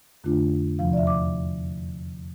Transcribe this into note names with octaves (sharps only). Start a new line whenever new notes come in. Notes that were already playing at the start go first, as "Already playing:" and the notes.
F2 D3 A3 D4 F4
E2 C3 F3 F5
D5
E5
D6